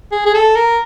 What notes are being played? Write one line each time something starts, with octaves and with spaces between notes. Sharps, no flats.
G#4
G#4
A4
A#4